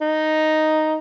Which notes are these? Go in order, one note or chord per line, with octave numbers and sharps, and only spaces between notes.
D#4